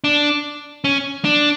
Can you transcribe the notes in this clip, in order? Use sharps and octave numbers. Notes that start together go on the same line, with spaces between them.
D4
C#4
D4